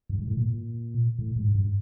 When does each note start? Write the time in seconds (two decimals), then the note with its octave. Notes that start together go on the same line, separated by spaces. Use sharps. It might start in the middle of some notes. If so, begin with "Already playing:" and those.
0.09 G2
0.19 G#2
0.28 A2
0.37 A#2
1.19 A2
1.36 G#2
1.55 G2